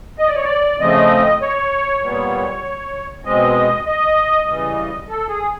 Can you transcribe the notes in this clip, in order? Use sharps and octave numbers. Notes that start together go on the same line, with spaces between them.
D#5
D5
C#5
D5
C#3 F3 A3 C4 D#5
C#5
A#2 G3 B3
B2 G#3 C4 D#5
D#5
C#3 E3 G3
A4
G#4